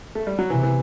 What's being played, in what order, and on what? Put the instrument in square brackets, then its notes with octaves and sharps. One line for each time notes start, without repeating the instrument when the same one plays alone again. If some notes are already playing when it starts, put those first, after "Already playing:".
[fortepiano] A3
G3
F#3
[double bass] C3 [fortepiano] E3
[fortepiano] E3